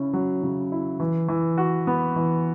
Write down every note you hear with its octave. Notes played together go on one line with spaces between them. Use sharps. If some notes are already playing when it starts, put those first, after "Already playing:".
Already playing: C#3 C#4 E4
F#3
C#3
E4
E3
E3
F#4
B3
E3